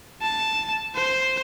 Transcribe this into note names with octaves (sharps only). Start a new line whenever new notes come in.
A5
C5